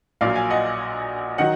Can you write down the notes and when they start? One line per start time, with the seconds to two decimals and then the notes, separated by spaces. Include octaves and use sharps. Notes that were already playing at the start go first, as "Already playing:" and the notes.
0.21 A#1 A#2 F#3 D5 F5
0.36 F5 G#5
0.50 D#5 F#5
1.38 D#3 F#3 D#5 F#5